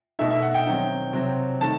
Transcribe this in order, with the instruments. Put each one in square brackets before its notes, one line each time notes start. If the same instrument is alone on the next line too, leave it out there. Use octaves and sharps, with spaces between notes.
[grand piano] B2 A3 D#4 E5
E5
F#5
G5
D#3 F#3 C4 D#4
C3 F#3 C4
D#3 A3 A5